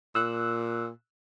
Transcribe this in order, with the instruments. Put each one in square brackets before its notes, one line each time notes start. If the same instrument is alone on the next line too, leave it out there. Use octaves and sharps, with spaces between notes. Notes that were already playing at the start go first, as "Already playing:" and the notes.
[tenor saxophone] A#2 [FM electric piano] E6 F#6